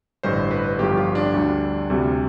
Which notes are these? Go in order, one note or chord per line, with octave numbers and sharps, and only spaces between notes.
A1 G2 D3 C5
B4
G1 G2 F3 G4
F4
D4
D2 D3 G3
D2 C3 G3